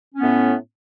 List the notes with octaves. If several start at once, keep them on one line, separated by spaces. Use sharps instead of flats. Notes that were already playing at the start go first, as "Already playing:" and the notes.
A2 B3 C#4